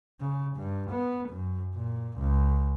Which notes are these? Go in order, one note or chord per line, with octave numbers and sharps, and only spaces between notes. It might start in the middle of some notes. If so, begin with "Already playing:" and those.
C#3
G2
B3
F#2
A#2
C#2